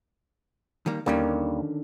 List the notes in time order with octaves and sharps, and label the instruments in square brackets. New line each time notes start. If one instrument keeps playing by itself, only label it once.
[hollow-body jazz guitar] D#3 G3 A#3
[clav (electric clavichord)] D#2 G3 A#3 [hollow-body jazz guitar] D3 D#3 C#4